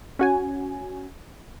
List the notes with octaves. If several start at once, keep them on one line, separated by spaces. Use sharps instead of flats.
C#4 F#4 G#5